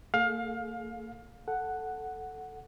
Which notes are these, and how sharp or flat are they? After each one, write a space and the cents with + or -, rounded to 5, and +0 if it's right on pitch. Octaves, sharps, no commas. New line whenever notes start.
A#3 -45 G#4 +35 F5 +25
A4 +0 F#5 +0